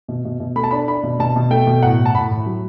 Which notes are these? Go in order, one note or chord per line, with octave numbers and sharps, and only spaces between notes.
B2
B2
B2
A3 B5
A5
D4 B5
D4 B5
B2
B2 A5
B2
A3 G5
B2
A2 F#5
A2
A5
A2 B5
A2
F#3